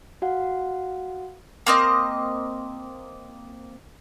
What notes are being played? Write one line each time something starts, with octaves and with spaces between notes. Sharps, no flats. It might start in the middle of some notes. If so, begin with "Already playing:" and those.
F#4 F5 F#5
A#3 C4 D#5